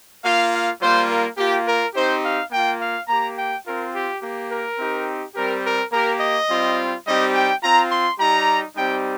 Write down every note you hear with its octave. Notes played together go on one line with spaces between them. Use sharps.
A#3 F4 F5
F5
G3 A#3 F4 C5
A#4
A#3 F4 G4
A#4
C4 D#4 G4 C5
F5
A#3 F4 G5
F5
A#3 G4 A#5
G5
C4 F4 A#4
G4
A#3 G4
A#4
C4 D#4 G4
G3 C4 G4 A#4
A#4
A#3 G4 A#4
D#5
G3 C4 F4
G3 C4 D#4 G4 D#5
G5
C4 F4 A#5
C6
G3 D#4 G4 A#5
G3 C4 D#4 G4 G5